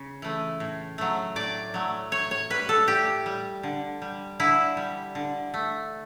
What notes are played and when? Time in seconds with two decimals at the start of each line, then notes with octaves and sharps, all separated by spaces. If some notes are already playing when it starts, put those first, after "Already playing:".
Already playing: C#3
0.22 E3 A3
0.60 A2
0.98 F#3 A3
1.36 A2 D5
1.74 F#3 A3
2.12 A2 C#5
2.31 C#5
2.50 G3 B4
2.69 A4
2.87 A2 G4
3.26 G3
3.63 D3
4.02 G3
4.40 D3 E4
4.77 G3
5.15 D3
5.54 A3